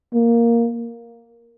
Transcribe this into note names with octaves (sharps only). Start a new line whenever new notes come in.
A#3